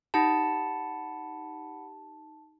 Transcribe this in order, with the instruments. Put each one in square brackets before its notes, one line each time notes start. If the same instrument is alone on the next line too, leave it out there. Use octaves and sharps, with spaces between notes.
[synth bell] D#4 G4 [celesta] F#5 B5 C#7 [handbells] A5